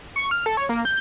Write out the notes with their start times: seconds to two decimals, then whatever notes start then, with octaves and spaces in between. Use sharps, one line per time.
0.16 C#6
0.31 F6
0.46 A4
0.57 C#5
0.69 A#3
0.85 G6